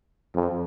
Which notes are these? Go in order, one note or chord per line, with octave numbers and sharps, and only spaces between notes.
F2